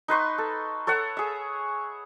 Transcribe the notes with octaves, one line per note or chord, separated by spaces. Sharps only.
D#4 B4 C6 C#6
A4
A4 C#5 E5 F#5
G#4 E5